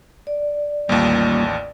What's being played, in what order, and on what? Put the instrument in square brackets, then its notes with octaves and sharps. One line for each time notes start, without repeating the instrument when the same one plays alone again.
[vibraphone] D5
[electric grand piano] A1 D#2 [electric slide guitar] G3 A#3 F4